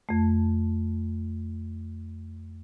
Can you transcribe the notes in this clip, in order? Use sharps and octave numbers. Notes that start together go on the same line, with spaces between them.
F2 A3